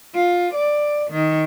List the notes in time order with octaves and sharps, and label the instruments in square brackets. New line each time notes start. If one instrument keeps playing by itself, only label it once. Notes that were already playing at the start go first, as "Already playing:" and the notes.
[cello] F4
D5
D#3